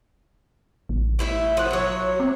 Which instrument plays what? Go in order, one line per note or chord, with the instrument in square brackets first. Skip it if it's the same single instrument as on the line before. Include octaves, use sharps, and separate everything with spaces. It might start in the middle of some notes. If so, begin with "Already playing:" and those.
[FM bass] A1
[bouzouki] A3 E4 E5
F3 F#5
F#3 C#5
[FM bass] C4